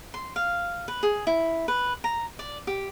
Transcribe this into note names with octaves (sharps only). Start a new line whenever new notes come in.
C6
F5
B4
G#4
E4
B4
A#5
D5
G4